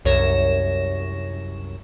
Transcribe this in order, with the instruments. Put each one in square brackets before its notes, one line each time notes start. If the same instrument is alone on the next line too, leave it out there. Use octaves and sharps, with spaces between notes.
[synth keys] C2 F#2 C#5 A#6 E7